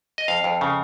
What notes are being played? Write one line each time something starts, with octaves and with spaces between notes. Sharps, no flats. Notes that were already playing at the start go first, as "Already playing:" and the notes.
D#5
F2 F5
F2
C#3